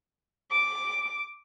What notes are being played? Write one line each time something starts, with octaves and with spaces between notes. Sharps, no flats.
D6